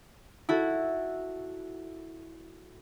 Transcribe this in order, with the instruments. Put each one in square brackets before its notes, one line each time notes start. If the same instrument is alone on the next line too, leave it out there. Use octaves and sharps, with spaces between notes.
[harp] E4 F#4 A4